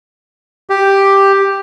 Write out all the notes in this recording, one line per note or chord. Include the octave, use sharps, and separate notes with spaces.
G4